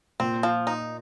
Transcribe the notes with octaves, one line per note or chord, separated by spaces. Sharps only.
A#2 C4
F3
D#4